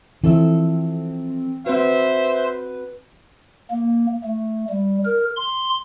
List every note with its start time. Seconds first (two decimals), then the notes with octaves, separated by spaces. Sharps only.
0.24 E3 F3 C4 A4 E5
1.66 C4 F#4 B4 C5 E5
3.70 A#3
4.23 A3
4.70 G3
5.05 A#4
5.36 C6